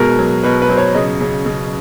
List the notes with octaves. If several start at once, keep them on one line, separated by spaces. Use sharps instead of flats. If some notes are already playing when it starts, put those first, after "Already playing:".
Already playing: B2 G#3 A#4
F#3
B2 B4
B4
F#3 C5
C#5
C#3 D#5
C#3
C#3